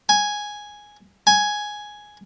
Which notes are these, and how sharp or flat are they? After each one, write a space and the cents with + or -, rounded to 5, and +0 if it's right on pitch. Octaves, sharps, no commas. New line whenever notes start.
G#5 +0
G#5 +5